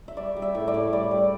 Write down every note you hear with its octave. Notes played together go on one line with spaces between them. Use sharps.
E5
G3 D5
G3
E5
A2
D5
A2
G3 D5
G3